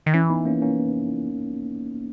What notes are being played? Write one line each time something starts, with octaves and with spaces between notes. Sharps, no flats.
D#3
E3 C#4 E4
B3 D#4
A#3 C#4
A#3 C#4